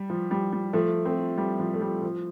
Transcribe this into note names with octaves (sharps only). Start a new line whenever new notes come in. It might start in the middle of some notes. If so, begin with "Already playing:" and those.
Already playing: G3
F3
G3
G3
F3 A3
A3 C4
G3
F3
A3
G3
F3